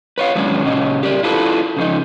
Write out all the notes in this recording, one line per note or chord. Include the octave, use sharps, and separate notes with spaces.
B4 C#5 F5
D#3 F#3 G#3 B3 C#4 D4
A#2 C#3 C#4 D#5
G4 A#4 D5
E4 F4 A4 B4
C#3 F3 D#4